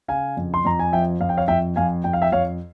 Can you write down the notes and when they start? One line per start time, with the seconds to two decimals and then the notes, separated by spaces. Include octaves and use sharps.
0.08 C#3 F5 G#5
0.37 F2
0.54 C6
0.65 F2 A#5
0.79 G#5
0.93 F3 E5 G5
1.20 F2 F5
1.29 G5
1.37 C#5 F5
1.48 F2 E5 G5
1.76 F2 F5 G#5
2.04 F2 G5
2.13 F5
2.22 E5 G5
2.32 F2 C#5 F5